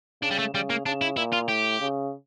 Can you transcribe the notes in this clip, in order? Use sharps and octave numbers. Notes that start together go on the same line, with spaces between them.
C#3 D4
G3
A3
C#3 G3
A#3
C#3 D4
E4
A#2 E4
F4
A2 G4
C#3